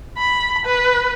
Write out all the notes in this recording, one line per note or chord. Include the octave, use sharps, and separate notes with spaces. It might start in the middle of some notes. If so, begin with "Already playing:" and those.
B5
B4